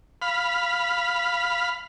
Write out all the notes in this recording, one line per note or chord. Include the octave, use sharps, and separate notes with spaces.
F5 B5